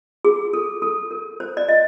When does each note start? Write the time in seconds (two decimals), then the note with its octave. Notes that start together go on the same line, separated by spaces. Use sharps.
0.25 G#4
0.53 A4
0.82 A4
1.11 A#4
1.40 C5
1.57 D5
1.69 D#5